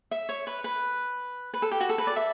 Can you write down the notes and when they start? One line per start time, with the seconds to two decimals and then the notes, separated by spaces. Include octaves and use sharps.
0.11 E5
0.29 C#5
0.47 B4
0.64 B4
1.54 B4
1.62 A4
1.71 G4
1.80 F#4
1.89 A4
1.98 B4
2.07 D5
2.16 E5